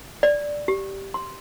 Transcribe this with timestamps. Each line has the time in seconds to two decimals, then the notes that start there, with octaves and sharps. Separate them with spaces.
0.23 D5
0.68 G4
1.14 C6